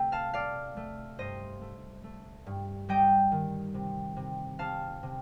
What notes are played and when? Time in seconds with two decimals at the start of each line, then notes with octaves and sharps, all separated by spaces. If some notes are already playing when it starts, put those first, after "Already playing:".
Already playing: C3 A3 G5
0.12 F5 A5
0.34 A3 D5 F5
0.77 A3
1.19 G2 C5 D#5
1.62 A3
2.04 A3
2.46 G2
2.89 G3 D#5 G5
3.32 D#3
3.74 C3
4.17 C3
4.59 C3 F5 A5
5.03 C3